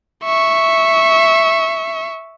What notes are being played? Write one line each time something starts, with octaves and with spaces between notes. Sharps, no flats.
E5 C#6